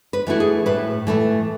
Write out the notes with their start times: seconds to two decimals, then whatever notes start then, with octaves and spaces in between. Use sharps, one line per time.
0.13 B4
0.27 E3 A3 E4 F#4
0.40 G#4
0.66 A2 B4
1.07 E3 A3 E4